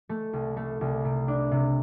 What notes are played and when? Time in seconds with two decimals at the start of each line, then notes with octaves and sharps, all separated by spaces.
0.09 A3
0.33 C2
0.57 A3
0.81 C2
1.05 C3
1.28 D4
1.52 C3